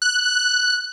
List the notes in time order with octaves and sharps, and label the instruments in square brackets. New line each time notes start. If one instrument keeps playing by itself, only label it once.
[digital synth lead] F#6